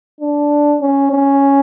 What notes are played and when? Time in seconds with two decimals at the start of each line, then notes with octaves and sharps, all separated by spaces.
0.21 D4
0.81 C#4
1.12 C#4